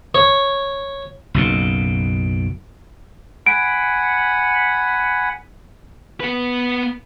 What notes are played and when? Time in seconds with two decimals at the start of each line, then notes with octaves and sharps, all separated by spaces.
0.15 C#5
1.34 F#1 B1 B2
3.46 F#5 G#5 B5 D7
6.20 B3 B4